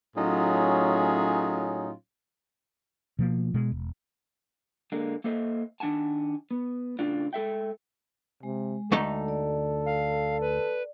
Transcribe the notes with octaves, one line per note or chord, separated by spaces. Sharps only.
A2 F#3 C#4 D#4 F4 G#4
B2 F3 A#3
B2 G#3
E1
D3 G#3 A#3
A#3 A4 C5 D#5 E5
D#3 D4 F#5 G#5 A5
B3
A2 C#3 D4 F4
G#3 A4 E5 G5
C3 G#3
D2 A3 D#4 A4
D5
F5
B4